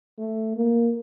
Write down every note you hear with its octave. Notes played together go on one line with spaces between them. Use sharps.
A3
A#3